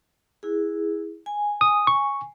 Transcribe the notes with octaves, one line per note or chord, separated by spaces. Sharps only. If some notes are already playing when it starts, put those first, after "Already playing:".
E4 G#4
G#5
D#6
C#6